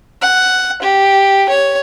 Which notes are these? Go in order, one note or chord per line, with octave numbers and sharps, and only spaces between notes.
F#5
G4
C#5